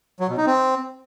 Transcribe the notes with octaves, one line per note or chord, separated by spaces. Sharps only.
F#3
B2
D#4
C4